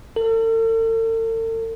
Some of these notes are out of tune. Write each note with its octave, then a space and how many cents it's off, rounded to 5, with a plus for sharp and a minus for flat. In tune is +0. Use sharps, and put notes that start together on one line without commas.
A4 +45